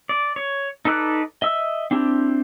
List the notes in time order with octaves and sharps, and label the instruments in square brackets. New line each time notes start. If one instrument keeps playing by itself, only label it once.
[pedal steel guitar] D5
C#5
D#4 A4 B4 D5 F#6
D#5 E5 E6
C4 D4 E4 G4